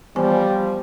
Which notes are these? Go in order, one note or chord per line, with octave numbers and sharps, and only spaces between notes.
E3 F3 G3 B3 G#5